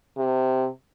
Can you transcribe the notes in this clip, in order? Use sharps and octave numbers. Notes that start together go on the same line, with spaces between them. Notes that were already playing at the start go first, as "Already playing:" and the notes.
C3